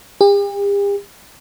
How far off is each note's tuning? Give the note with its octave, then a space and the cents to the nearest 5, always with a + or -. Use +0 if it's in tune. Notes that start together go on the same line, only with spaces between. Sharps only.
G4 +45